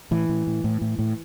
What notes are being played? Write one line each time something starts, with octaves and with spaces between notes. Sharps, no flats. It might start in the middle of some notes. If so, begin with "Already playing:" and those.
A2 E3
A2
A2
A2
A2
A2